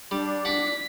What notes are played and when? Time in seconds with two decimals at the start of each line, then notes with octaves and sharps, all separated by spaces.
0.11 G3 D4
0.45 F#5 D6 B6